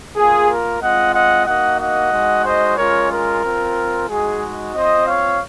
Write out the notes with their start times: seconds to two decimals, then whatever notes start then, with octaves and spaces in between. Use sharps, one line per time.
0.15 A#3 F4 G#4
0.49 A#4
0.81 G#3 C4 F4 D#5 F#5
1.14 D#5 F#5
1.46 A#3 D#4 F#4 D#5 F#5
1.80 D#5 F#5
2.12 G#3 D#4 F#4
2.45 C5 D#5
2.77 G#3 C#4 F4 A#4 C#5
3.11 A#4
3.44 C4 F4
4.09 G#3 D#4 F#4 G#4
4.74 C4 F4 C5 D#5
5.07 C#5 F5